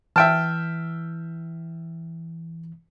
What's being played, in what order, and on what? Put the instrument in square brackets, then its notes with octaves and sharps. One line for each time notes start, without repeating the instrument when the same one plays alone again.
[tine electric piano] E3 [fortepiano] E5 G5 A5 [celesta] F6